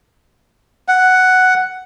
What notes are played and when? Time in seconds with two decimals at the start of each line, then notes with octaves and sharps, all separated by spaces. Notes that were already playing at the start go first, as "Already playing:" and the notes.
0.88 F#5